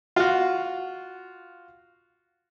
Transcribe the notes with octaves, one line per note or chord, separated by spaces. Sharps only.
F4 F#4